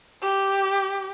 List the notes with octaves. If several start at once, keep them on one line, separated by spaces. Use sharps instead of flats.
G4